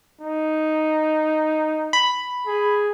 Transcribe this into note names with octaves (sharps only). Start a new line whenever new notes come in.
D#4
B5
G#4